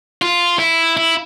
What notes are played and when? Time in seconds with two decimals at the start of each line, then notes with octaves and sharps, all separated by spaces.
0.22 F4
0.59 E4
0.97 E4